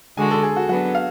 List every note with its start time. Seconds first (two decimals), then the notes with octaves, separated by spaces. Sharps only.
0.17 D3 G#3 D4 F#4 G#5
0.31 A4
0.43 G#4
0.56 F#4
0.68 F#3 B3 D4 F#4
0.95 F5